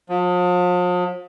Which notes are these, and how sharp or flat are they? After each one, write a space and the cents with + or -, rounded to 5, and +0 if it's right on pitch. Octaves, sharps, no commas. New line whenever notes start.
F3 +40